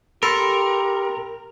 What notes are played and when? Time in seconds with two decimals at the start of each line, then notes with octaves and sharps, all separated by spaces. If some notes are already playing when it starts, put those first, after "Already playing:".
0.23 G4 A4 A#4 B5 C6 E6